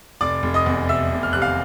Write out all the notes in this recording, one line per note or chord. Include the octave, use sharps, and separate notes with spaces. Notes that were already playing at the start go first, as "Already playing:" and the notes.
F1 D5 D6
F1
D#5 D#6
E2
F1 E5 E6
F1
F6
C3 F#6
F5 F6